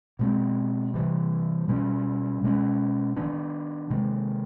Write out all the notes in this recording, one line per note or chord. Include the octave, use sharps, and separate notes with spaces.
B2 G#3 C4
C3 E3 G3
B2 G3 A#3 C#4
B2 G#3 C#4
D#3 F#3 B3 D4
C3 D#3 G#3